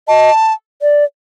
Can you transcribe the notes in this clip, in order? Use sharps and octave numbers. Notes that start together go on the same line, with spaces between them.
D#5 A5
D5